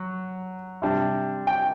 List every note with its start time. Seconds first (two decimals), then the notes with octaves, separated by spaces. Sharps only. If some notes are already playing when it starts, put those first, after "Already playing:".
Already playing: F#3
0.82 C3 G3 D4
1.47 G5